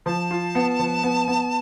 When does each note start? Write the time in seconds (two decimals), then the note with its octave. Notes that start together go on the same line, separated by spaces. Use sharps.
0.06 F3 A5
0.31 F4
0.55 B3
0.79 F3
1.03 B3
1.28 B3